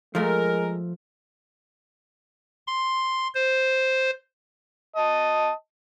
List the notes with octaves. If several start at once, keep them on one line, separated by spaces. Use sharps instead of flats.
F3 G#3 A3 A#4
C6
C5
D#5 A5